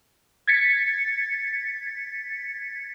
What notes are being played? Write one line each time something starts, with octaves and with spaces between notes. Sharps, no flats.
G#6 A6 B6 C#7